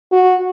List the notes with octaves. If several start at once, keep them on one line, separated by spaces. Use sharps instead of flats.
F#4